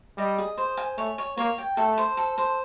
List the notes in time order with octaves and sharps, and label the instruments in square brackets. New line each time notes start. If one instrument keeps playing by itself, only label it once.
[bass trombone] G3 [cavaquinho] D#5
[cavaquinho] G#4
C5
G#5
[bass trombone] A3 [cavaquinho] C#5
[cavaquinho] C#5
[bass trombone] A#3 [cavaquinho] C#5
[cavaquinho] G5
[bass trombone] A3 [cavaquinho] A4
[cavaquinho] C5
A4
C5